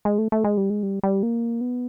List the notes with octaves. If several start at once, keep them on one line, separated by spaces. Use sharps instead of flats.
G#3
A3
A3
G#3
G3
G#3
G3
G3
A#3
B3